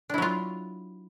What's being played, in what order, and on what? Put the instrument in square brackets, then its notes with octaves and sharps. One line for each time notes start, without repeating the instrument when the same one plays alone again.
[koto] D4
E4
F#3
F4